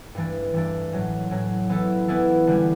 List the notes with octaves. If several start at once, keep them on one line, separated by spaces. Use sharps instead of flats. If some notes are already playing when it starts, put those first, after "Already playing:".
G2 E3 A3 D4
G2 E3 A3 D4
A2 F#3 C#4
A2 F#3 C#4
E3 B3 E4 A4
E3 B3 E4 A4
D3 G3 C#4